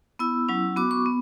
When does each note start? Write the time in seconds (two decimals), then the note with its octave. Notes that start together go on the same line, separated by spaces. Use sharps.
0.19 B3 E4 E6
0.49 F#3 C#4 E4
0.76 B3 F#4 D6
0.91 C#6
1.06 B3